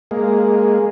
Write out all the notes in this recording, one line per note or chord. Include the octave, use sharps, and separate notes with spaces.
G#3 A#3